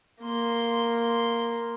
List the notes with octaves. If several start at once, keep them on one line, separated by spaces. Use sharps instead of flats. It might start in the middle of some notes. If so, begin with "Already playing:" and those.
A#3 C6